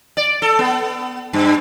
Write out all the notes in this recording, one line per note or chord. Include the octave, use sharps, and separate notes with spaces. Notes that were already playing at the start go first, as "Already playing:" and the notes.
D5
A4
B3
G2